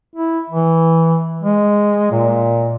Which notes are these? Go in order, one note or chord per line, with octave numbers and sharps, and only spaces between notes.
E4
E3
G#3
A#2